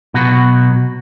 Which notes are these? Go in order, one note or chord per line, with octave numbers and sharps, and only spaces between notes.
B2 F#3 F#4